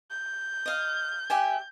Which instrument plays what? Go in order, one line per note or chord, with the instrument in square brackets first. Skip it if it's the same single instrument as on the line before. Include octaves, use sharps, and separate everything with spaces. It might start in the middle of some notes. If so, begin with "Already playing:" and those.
[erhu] G6
[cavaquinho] D#5 F5
G4 E5 G#5